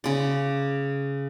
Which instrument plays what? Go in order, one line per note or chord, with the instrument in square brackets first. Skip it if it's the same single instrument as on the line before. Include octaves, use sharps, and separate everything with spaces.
[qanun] C#3 D5